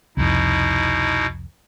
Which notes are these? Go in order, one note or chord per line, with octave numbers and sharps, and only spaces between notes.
C2 F2 B2 D#4 E4